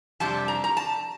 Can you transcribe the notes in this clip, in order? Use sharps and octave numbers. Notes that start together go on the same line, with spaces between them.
F2 C3 G3 D4 A5
A#5
A#5
A5